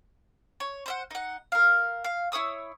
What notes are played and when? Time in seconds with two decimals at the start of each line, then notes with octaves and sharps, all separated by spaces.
0.60 C#5
0.86 C5 E5 F#5
1.11 D#4 F#5
1.52 A#4 F5
2.04 F5
2.32 E4 C#5 D#6 E6